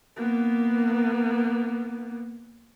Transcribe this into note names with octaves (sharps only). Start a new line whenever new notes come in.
A#3 B3